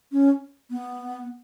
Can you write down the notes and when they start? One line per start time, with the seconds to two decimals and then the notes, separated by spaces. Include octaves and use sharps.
0.12 C#4
0.71 B3